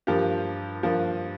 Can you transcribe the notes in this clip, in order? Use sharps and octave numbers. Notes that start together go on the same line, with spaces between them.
G2 F3 A#3 G4
G2 F3 A#3